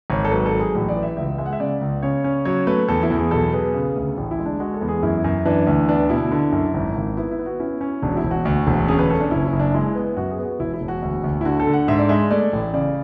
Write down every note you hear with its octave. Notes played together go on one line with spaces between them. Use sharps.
G#1 C#5
A4
F#3 B4
A4
F#3
G#4
A1 F#4
D5
E3
E5
C#2 E5
G#3 E5
F#5
E5
C#3 D5
C#2
C#3 C#5
C#4
F#3 C#5
A3 B4
E2 A4
E4
E2
G#4
B1 A4
B3 G#4
C#3
D2
A1
E4
G#3
D4
G#3 F#4
A4
E2
G#4
F#2 E4
F#2
E3 D4
D2
B3 D4
B2 E4
D3
F#2
G#1
G#1
B3 E4
E4
B3
F#4
C#4 E4
C#4
E1 D4
F#4
E4
E1
F#4
D2
E1
C#4 G#4
B4
C#4 A4
D4
F#1 E4
E4
F#1
D4
G#3 E4
B3
F#2 F#4
G#4
B3
F#4
E1 E4
E4
E1
F#4
D2
D2
E4
D3 F#4
A4
D3
F#5
G#2 E5
D5
G#3 E5
A3 D5
A1
C#3 D5